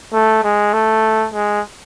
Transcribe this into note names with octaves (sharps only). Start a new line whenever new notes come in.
A3
G#3
A3
G#3